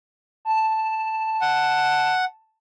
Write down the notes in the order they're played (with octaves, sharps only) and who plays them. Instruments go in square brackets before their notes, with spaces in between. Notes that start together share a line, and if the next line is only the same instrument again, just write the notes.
[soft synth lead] A5
[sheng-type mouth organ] F#5